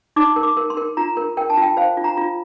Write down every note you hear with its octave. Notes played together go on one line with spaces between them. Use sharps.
D#4 D6
A#4
D6
A#4
C6
A#4
F4 A#5
A#4
A#4 G5
A5
F4 G5
C5 F5
F4
A#5
F4